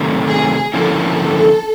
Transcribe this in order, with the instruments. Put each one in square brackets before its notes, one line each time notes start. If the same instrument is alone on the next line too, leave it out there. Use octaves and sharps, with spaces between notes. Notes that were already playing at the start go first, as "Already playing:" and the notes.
Already playing: [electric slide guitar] C3 D#3 F#3 A3
[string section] G#4
[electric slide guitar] D3 F3 A#3 C#4 E4 [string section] A4